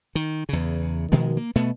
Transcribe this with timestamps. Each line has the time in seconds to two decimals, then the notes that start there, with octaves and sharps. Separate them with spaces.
0.15 D#3
0.49 E2 C#3
1.12 B2 D#3 F3 G#3
1.37 A#3
1.56 B2 A3 B3